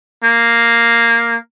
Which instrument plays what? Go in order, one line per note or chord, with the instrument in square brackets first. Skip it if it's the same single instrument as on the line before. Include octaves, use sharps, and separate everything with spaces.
[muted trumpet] A#3